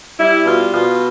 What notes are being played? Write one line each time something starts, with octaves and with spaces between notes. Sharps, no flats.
G3 E4
B2 F4
B2 F4